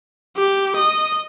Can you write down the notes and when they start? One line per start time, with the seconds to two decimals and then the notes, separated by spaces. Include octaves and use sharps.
0.37 G4
0.75 D#5